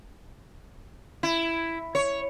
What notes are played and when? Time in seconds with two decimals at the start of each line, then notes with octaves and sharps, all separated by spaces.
1.23 E4
1.95 C#5